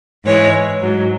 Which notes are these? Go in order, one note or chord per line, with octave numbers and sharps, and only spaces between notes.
G#2 E3 G#3 C#5
G#2 F#3